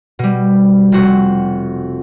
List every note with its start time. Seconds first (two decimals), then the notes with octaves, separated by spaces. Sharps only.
0.19 B2 G3
0.92 F1 C4 F#4